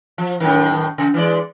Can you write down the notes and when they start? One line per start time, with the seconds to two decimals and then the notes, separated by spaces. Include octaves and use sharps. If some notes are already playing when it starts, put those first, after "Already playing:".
0.18 F3
0.40 F#2 A2 D#3
0.98 C#3
1.14 E3 G#3 D5